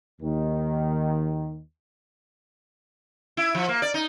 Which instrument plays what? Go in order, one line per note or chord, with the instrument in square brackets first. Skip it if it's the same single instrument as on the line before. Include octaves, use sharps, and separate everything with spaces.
[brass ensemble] D#2 D#3
[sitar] E4
F3
A#3
D5
D#4